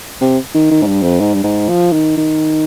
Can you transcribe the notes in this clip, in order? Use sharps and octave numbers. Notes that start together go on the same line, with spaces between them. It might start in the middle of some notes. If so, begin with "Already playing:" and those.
C3
D#3
D#3
G#2
G2
F2
G#2
G2
G#2
F3
D#3
D#3